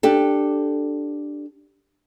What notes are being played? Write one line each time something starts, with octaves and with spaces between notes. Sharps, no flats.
D4 G4 A4